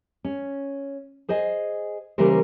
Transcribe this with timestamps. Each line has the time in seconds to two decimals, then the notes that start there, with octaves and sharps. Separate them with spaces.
0.24 C#4
1.29 G#4 C5 D#5 G#5
2.18 C#3 E3 G3 A#3 A#4 C5